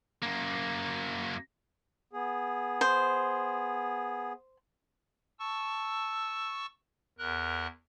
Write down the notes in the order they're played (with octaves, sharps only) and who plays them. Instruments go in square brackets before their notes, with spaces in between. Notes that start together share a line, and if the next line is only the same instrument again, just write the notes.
[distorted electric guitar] F#2 A#3
[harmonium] B3 G#4
[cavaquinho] C5
[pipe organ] A5 C#6 E6
E2 A#4 F#6